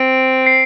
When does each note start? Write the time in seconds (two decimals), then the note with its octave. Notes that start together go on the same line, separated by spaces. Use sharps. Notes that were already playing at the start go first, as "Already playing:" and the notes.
Already playing: C4 D7
0.46 C7